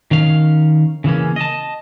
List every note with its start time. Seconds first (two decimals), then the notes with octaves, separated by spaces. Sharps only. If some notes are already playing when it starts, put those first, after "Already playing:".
0.11 D#3 C#4 F5
1.04 C#3 E3 A#3 C#4
1.36 D#5 A5